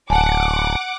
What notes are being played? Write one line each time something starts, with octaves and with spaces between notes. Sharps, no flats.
D1 F#5 G#5 A5 D6